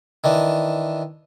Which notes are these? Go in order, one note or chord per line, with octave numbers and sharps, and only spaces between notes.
D#3 E3 D4